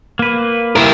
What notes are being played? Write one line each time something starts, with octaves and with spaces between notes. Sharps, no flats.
A#3 B4
E4 A#4